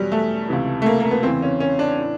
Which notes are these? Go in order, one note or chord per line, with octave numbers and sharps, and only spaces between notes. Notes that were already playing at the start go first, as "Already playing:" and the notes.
Already playing: E2 B2 F#3 G3
A3
C#2 C3 E3
A3
A#3
A#3
B3
E2 C#3 E3 C4
C#4
C#4
D4
A2 E3